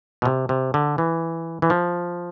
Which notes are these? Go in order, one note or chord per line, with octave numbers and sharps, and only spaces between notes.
B2
C3
C3
D3
E3
E3
F3